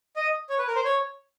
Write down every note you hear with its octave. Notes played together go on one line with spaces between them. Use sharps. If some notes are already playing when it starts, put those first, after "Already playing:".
D#5
C#5
B4
A#4
C5
C#5